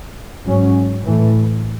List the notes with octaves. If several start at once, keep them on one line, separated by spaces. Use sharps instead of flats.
G#2 F#3 C#4
A2 E3 A3